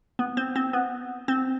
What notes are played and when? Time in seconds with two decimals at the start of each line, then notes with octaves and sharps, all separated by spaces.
0.19 B3
0.37 C4
0.56 C4
0.73 B3
1.28 C4